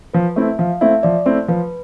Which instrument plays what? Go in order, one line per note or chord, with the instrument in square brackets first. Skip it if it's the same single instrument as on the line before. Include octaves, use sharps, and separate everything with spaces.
[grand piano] F3 [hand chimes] B4
[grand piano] A3 C4 E4 [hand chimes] E5
[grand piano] F3 [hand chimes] F5
[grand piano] A3 C4 E4 [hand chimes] E5
[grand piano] F3 [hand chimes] D5
[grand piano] A3 C4 E4 [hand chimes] C5
[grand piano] F3 [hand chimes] B4